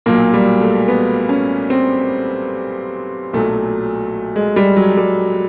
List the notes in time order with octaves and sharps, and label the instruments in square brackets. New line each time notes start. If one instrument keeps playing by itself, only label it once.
[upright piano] B1 A#2 F#3 A#3
G3
A3
B3
C#4
C4
B1 A#2 F#3 A3
G#3
G3
F#3
G3